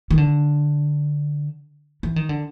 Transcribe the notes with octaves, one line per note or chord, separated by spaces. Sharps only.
D#3
D3
E3
D#3
D3